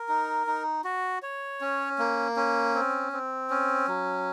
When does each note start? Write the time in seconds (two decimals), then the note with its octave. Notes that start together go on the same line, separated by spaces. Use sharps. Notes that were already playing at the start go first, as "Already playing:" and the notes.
Already playing: A#4
0.09 D#4
0.47 D#4
0.84 F#4
1.22 C#5
1.61 C#4
1.98 A#3
2.37 C#4
2.75 C4
3.13 C4
3.50 C#4
3.88 F#3